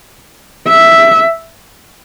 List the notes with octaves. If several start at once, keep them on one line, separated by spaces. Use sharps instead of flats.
E5